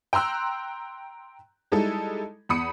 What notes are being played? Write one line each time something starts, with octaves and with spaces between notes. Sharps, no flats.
G5 A#5 C6 E6 F#6
G3 G#3 D#4 E4 A4
E2 B5 D#6 C#7